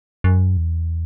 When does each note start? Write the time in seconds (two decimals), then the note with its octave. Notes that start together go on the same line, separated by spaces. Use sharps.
0.24 F#2
0.57 E2